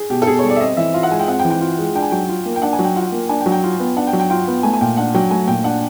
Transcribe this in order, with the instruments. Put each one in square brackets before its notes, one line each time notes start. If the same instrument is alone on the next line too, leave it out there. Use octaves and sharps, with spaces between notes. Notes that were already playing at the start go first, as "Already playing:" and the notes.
Already playing: [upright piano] G#4
[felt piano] B2 [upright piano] G4
[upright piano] A4
[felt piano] B2 [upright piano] G#4
[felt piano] G3 [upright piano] C#5
[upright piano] D5
E5
[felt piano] C4 [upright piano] D#5
[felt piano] E3 [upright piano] E5
[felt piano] F4 [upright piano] F5
[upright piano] F#5
[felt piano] G#3 [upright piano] G#5
[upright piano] G5
[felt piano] C4 [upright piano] F#5
[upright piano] G5
[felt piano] E3
[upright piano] G5
[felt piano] F4
G#3
[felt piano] D4 [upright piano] G5
[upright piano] G#5
[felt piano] F#3 [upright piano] G5
[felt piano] F4
A#3
[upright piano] G5
[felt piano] D4 [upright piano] F#5
[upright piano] G#5
[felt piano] F#3
[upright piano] G5
[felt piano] F4 [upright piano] F#5
[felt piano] A#3
[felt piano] D4 [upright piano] G#5
[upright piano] G5
[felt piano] F#3
[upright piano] G5
[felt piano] F4
B3
[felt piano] D4 [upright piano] F#5
[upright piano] G5
[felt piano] F#3
[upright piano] G5
[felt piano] F4 [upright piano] G5
[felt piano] B3
[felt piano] A3 [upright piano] G#5
[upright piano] G#5
[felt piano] A#2 [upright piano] G5
[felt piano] D4 [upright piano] F#5
[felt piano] F#3 [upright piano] G5
[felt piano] A3 [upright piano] G#5
[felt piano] A#2 [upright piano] G5
[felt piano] D4 [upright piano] F#5